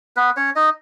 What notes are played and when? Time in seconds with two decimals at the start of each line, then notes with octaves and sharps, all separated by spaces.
0.16 B3 B4
0.37 C#4 C#5
0.56 D#4 D#5